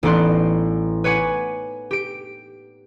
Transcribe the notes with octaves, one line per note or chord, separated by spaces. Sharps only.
A1 B3 D#4 D5 C6 F#6
B4 C#5 F#5 G#5 D6
G4 D7